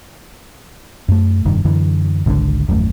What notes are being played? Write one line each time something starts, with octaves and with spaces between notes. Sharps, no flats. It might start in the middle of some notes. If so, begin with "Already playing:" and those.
F#2 A3
F1 G2 D#3
F#2 D3 E3
G#1 C#2 B2 D3
D#1 A#1 F#2 A3